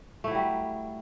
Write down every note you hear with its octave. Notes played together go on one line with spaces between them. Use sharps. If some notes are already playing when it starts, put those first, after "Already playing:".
F#3 G3 A3 E4